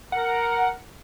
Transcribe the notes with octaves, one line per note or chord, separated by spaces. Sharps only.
A#4 F#5